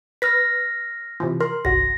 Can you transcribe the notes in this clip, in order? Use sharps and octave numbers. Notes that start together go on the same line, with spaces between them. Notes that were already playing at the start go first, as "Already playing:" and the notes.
B4 F6 A#6 B6
C3 E3 F3
A#4 C6
G1 C2 F#4 A#6